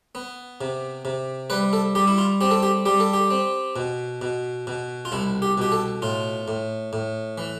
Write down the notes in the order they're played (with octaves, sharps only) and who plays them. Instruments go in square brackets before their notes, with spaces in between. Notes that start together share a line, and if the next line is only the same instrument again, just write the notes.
[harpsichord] B3
C3
C3
G3 B4
A4
G3 G4
E4
F4
C4 G4
A4
G4
G3 G4
A4
G4
C4
B2
B2
B2
F4
C2 E4
G4
B2 G4
A4
A2 F4
A2
A2
E3